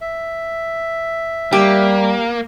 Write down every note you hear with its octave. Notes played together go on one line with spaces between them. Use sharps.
E5
G3 A#3 G4